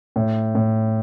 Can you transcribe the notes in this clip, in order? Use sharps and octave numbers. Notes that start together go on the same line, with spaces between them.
A2
A2